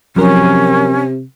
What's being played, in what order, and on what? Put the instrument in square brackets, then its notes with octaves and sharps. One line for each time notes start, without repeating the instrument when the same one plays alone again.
[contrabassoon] C3 [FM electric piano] F3 F#3 A#4 [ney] C#4